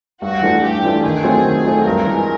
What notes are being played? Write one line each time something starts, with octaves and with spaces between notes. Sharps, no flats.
G2 F#4
E3 A3 D4 F4
G2 G4
E3 A3 D4 F4
D#3 G#4
F#3 A3 C4 F4
D#3
F#3 A3 C4 F4
G2 A#4
E3 G#3